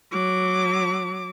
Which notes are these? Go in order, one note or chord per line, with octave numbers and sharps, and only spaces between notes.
F#3 D6